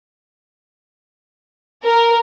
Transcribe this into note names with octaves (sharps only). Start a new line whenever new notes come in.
A#4